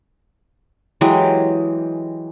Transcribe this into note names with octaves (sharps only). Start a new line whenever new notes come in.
E3 F#3 G#3 G4